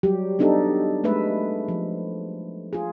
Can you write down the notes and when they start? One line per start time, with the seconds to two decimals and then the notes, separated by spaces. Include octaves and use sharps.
0.03 F#3 G3 G4
0.39 B3 D4 D#4 G4 A4
1.04 G#3 A3 B4 E5
1.68 F3
2.73 F4 G#4